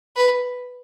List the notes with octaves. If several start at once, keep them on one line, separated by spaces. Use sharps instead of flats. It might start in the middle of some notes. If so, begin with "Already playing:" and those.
B4